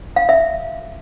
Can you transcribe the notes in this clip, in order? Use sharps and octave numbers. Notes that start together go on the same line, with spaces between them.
F5
E5